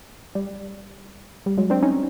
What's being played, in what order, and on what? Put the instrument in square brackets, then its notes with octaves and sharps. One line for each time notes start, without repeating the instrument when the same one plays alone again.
[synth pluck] G3
G3
F#3 G#3
C4 D4
C#4 D#4